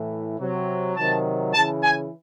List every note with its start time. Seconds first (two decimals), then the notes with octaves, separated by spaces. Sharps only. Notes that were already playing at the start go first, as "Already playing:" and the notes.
Already playing: A2 E3
0.39 C3 F#3
0.96 C3 D#3 F#3 A5
1.53 C#3 E3 A5
1.82 G#5